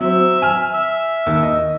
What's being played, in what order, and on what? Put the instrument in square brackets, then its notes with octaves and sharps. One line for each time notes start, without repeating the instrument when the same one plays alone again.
[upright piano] F#3 C4 [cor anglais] E5
[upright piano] G#5 F6
[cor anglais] E5
[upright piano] D#2
D#5